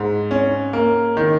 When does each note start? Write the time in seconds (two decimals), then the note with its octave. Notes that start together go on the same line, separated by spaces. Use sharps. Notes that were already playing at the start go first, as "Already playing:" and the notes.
Already playing: G#2
0.31 C#4
0.73 A#3
1.17 D#3